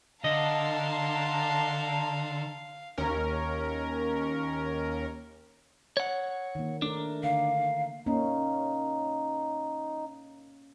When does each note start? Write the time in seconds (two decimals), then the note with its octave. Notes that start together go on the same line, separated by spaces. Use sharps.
0.24 D3 D#5 F5 A5 A#5 C6
2.98 D#2 C#4 A#4
5.97 C#5 F#5
6.55 D#3 A#3
6.82 A3 D4 A#4
7.23 D3 F5
8.06 A#3 C#4 D#4